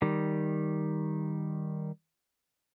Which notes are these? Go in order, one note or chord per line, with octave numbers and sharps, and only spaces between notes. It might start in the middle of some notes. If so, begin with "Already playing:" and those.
D#3 G3